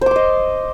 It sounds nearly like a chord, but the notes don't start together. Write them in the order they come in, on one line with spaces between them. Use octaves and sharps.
C5 D6 C6 D#5